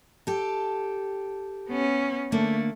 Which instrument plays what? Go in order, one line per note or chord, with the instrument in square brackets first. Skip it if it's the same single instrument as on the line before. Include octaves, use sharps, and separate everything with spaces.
[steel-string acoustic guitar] G4 A4
[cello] B3 C#4
[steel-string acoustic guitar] D3 A#3 [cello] A3